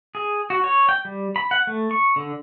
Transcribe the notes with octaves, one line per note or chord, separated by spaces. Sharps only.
G#4
F#4
C#5
G5
G3
B5
F#5
A3
C#6
D3